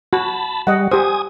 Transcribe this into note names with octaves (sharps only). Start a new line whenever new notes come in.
F#4 A5 B5
G3 D#5 F#5
G4 C5 G#5 D#6